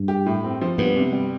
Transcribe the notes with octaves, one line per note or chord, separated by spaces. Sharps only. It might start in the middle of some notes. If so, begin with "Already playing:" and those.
Already playing: G2
G4
A2
C4
F3
G2 B3
C3
G3